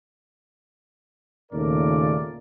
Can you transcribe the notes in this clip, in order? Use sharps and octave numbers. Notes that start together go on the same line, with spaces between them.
D#2 A#2 C#3 A3 A#4 D5